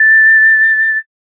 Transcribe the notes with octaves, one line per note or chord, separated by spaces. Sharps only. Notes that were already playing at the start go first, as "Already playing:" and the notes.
Already playing: A6